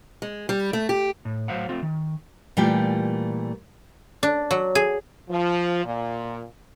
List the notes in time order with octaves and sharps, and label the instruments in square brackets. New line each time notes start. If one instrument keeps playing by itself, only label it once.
[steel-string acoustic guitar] G#3
G3
A3
G4
[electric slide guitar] A2
A2 F#3 C5 F5 F#5
A3 C4 F4
D#3
[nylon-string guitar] A#2 E3 G3 A3 F4 G4
[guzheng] D4
F#3
G#4
[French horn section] F3
A#2